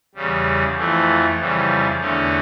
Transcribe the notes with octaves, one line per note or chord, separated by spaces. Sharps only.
E2 C#3 G3
F2 E3 A3
F2 C#3 E3 G3
E2 D3 A3 C#4